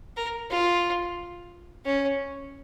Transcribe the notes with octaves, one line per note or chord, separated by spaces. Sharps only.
A#4
F4
C#4